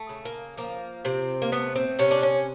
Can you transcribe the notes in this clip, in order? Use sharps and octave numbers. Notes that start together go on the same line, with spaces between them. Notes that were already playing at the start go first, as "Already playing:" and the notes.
Already playing: A3
C#3
A#3
F3 A#3
C3 C4
A#3
A3 B3
C4
C3 C#4
D4
C#4